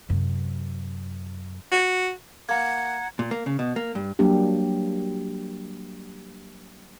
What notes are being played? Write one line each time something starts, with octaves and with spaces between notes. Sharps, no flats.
F#2 C3
F#4
A#3 F#5 A#5 G#6
A#2
A#3
C#3
B2
A#3
G2
F#3 G3 A#3 D4 G4